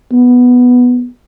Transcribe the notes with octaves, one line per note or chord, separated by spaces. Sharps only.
B3